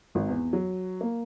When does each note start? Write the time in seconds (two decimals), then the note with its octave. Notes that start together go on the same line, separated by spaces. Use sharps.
0.15 G#1
0.28 E2
0.53 F#3
1.01 A#3